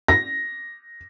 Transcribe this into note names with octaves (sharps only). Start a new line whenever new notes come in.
A#6